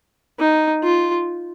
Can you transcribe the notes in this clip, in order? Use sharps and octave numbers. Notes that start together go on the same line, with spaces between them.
D#4
F4